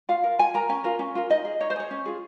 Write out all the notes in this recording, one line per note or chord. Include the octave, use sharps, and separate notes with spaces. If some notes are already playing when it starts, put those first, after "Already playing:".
F4 F5
A#4
F4 G#5
A#4 A#5
C#4 G#5
F4 A#4
C#4
F4 A#4
D#4 D#5
G#4
D#4 C#5
C5
G#4 C#5
C#4
F4 G#4